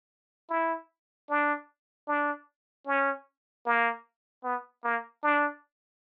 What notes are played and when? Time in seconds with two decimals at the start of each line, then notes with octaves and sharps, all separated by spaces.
0.50 E4
1.30 D4
2.08 D4
2.87 C#4
3.66 A#3
4.44 B3
4.84 A#3
5.23 D4